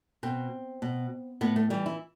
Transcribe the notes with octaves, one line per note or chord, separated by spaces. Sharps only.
B2 C4
B2
A2 B3
A3
E3 G3
E4